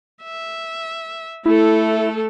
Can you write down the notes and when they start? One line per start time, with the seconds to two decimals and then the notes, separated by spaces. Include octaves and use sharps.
0.23 E5
1.46 A3 E4 A4